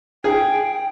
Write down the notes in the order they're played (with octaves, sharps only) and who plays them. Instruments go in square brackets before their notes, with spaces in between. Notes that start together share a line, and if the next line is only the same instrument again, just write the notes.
[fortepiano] G#4 [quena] G5